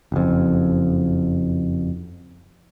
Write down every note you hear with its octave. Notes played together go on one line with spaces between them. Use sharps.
F#1 F2